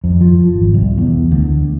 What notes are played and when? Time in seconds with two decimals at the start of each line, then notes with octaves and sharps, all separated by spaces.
0.04 F2
0.21 F3
0.54 G#1
0.74 C2
0.98 E2
1.31 D2